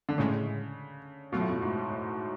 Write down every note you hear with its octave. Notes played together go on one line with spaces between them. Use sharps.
D3
A2 C#3 G#3 C#4
B2 F#3 A3 F4
A2
B2
G#2
A2